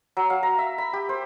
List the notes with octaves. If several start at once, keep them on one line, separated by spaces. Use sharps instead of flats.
F#3
F5
A#5
E5
B5
G4
C5